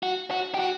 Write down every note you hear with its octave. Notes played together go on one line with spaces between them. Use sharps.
F#4
F#4
G4
F#4